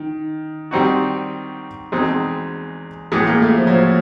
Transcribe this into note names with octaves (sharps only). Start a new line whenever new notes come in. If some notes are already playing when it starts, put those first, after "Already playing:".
Already playing: D#3
D#3 G3 C4 D#4 F#4
E2 B2 G#3 C4 D#4
A2 E3 G#3 B3
A#3
A3
F3
F#3
F3